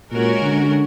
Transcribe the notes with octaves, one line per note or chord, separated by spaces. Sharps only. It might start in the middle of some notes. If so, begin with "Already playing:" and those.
A#2 G#3 C#4 F#4 A#4
D3